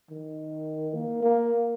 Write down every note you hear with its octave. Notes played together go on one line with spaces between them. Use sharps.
D#3
A#3
A#3